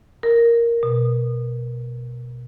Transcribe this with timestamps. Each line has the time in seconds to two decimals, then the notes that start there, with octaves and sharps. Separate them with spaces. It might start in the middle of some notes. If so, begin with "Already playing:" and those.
0.23 A#4
0.83 B2